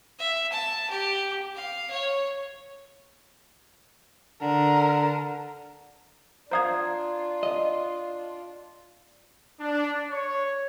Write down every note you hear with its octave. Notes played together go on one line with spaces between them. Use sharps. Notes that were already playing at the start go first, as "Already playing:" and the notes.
E5
A5
G4
F5
C#5
D3 A#4
D4 F4 C5 F5 A#5 D#6 G#6
D#5
D4
C#5